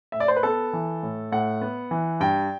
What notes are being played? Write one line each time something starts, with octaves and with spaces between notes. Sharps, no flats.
A2 E5
D5
C5
B4
B3 A4
E3
A2
A2 F#5
B3
E3
G2 G5